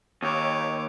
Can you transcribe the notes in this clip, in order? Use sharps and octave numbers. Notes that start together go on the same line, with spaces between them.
D#2 C#5 D6